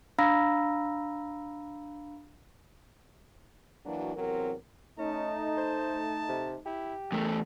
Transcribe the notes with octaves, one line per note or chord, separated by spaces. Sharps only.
D4 F5 A#5 B5 E6 A#6
E3 F#3 A#3 D4 F#4
E2 C3 F#3 C4 A#4
A3 C#4 D#4 A5
C5
C3
E4 G4
E2 A3 A#4